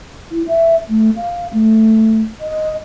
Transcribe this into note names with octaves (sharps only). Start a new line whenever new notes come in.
E4
E5
A3
F5
A3
D#5